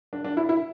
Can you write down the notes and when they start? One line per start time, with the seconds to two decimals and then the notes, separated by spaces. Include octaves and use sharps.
0.13 D4
0.25 D4
0.37 E4
0.49 E4